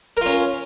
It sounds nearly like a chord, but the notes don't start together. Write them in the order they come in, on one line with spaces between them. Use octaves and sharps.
A#4 F4 C#4